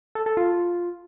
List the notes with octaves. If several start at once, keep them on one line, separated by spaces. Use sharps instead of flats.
A4
A4
F4